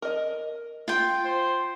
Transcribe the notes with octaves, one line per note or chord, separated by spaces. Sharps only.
A#4 D#5
F4 G5
C5